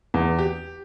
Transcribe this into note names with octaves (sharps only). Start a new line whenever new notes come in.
E2
G4